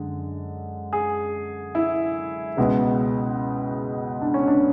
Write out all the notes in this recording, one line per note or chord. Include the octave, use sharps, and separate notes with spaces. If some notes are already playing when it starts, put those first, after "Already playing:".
Already playing: F#2 D3 G#3
G#4
E4
C#2 B2 G#3
D4
C#4
D4